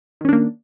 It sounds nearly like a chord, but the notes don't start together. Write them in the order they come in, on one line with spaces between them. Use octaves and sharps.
D#3 C#4 D4 A#3